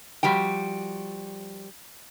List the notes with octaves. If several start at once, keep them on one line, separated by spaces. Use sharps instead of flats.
F3 G3 F#4 G5